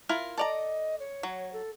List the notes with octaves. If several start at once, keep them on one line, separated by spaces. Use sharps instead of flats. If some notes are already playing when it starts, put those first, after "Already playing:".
E4 F4 A#4
A4 D5 D#5 A#5
C#5
F#3
A4